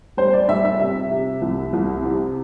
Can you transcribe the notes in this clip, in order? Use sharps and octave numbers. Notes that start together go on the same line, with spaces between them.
G3 C5
D5
G3 E5
E5
C3 E5
C3
C2
C2
C3